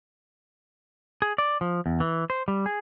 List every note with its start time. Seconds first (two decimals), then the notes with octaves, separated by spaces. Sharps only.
1.22 G#4
1.38 D5
1.61 F3
1.86 E2
2.00 E3
2.30 C5
2.48 G3
2.66 G#4